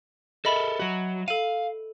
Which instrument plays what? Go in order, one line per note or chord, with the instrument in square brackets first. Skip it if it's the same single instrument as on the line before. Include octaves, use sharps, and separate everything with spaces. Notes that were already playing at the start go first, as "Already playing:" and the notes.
[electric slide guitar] A4 A#4 [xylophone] D#5 E5 B5
[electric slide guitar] F#3 F#4
[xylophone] A4 D#7 [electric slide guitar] F5